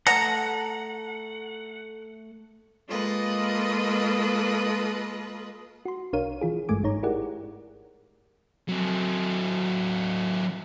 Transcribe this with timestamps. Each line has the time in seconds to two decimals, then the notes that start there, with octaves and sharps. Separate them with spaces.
0.07 A3 F#5 A5 A#5
2.87 G#3 A#3 F4 A4 B4 D#5
5.85 F#4 C6
6.13 B1 D4 A#4 C#5 F5 D#7
6.41 E3 F4 G#4
6.69 G#1 G2 G#3 A3 G#5 D6
6.83 G1 G#2 D#4 C#5 A#5
7.03 E4 G4 G#4 A#4 D5 F#5
8.68 F#3 C4